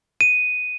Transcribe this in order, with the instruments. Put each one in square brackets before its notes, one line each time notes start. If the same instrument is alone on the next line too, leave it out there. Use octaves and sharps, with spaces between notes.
[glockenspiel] D#7